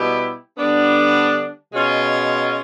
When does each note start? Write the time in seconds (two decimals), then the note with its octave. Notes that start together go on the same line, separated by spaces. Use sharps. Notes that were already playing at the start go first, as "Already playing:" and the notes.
Already playing: B2 G3 B3 E4 G4
0.58 D3 G3 B3 D4
1.72 B2 G#3 C#4 F4